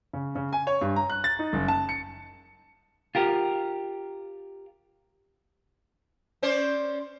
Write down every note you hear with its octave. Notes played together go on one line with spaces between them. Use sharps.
C#3
C#3
G#5
C#5
G2
A#5
F#6
A6
D#4
F#1
A5
C#7
F4 G4 A#4
C#4 C5 D5